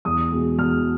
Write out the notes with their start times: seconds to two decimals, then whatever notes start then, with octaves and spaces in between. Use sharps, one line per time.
0.05 E2 D#6
0.32 B2 G#3
0.58 E2 F6